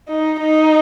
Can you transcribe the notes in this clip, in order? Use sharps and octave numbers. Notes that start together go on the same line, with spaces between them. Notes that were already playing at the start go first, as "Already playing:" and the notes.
D#4
D#4